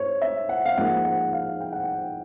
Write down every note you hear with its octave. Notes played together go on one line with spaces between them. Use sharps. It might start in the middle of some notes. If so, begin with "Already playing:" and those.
Already playing: G#2 C4 C5 C#5
E5
F#5
F5
G#2 F3 A#3 F#5
F#5
F5
G5
F#5
G5